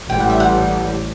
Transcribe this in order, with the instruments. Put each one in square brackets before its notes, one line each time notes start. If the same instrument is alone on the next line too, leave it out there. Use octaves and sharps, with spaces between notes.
[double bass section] A1 A2 G3 [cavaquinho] G5
[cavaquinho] F#5
E5
F#5